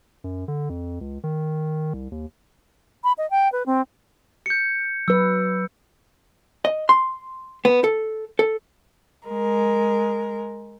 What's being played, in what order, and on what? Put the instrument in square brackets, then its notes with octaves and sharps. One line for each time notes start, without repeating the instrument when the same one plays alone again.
[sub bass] F#2
D3
F2
C#2
D#3
C2
D#2
[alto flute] B5
D#5
G5
B4
C4
[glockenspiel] G6 C#7
[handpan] F#3 B4 [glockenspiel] E6
[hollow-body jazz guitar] D#5
C6
B3
A4
A4
[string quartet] G#3 A#4